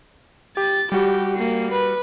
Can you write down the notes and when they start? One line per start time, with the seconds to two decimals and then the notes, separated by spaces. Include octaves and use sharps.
0.57 G4 A6
0.92 G3 F#4 G4
1.36 A#3 C7
1.72 B4